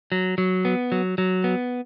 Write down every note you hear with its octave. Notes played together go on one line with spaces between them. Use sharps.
F#3
F#3
B3
F#3
F#3
B3